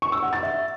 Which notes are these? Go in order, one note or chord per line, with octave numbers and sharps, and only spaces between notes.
C#6
E6
F#5
A6
E5